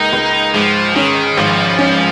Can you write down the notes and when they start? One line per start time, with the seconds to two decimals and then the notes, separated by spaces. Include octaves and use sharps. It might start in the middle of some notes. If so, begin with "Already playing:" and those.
Already playing: C#2 A#3 D#4
0.13 C#2
0.54 G#2 F3
0.96 D#3 C#4
1.37 G#1 F3
1.79 C#4